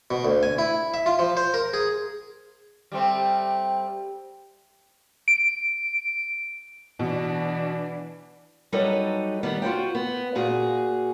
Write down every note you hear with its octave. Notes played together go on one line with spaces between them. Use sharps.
B2
D2
G#5
E4
E5
F4
F3
C5
A#4
G#4
G3 A3 C4
D7
B2 E3 D4
F#3 G3 D#4 A4 B4 D#5
D#3 G3 B3
F4 F#4 C5 G5
B3
A#2 F#4 G#4